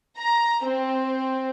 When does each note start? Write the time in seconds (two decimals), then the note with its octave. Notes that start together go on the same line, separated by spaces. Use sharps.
0.17 A#5
0.65 C4